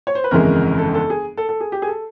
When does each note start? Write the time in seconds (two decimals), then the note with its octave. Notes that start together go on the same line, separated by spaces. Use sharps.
0.07 C#5
0.15 C5
0.24 B4
0.31 G1 F2 C#3 E3 G#3 A#4
0.78 A4
0.94 A4
1.10 G#4
1.37 A4
1.49 A4
1.60 G#4
1.72 G4
1.82 G#4
1.88 A4